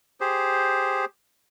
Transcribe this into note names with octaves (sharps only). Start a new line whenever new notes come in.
G4 G#4 C5